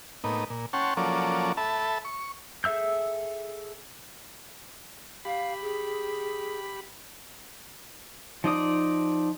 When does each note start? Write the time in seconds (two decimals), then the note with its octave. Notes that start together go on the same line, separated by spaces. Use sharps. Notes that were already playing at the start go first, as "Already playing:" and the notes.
0.24 A2 A#3 B3 D#4
0.50 A#2
0.73 C#4 F#5 G5 A5 C6 C#6
0.97 F3 F#3 A#3 C#4 A4 D5
1.57 A4 E5 A5 B5
2.05 C#6
2.64 G#4 A4 E5 E6 G6
5.25 G4 F5 B5
5.62 G#4
8.44 F3 D#4 D5 D#6